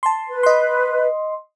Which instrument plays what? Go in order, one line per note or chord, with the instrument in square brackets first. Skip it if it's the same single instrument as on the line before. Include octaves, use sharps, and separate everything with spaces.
[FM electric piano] A5 C6
[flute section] B4
[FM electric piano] D#5 C6